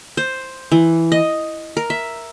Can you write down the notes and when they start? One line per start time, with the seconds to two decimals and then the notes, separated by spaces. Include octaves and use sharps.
0.17 C5
0.72 E3
1.12 D#5
1.77 A#4
1.90 E5